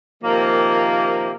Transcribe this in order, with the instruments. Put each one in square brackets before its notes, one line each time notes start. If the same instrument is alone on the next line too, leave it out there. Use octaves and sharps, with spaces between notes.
[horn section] C3 D#3 F3 A#3